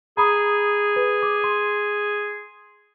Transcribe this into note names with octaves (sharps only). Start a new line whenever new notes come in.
G#4 A#5 B5 D#6
B4
D6
C6